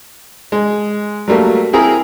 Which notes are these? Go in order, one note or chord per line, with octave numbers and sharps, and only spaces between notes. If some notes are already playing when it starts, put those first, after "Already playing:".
G#3
F#3 G3 A3 A#3
C4 E4 G#4 A#4 A#5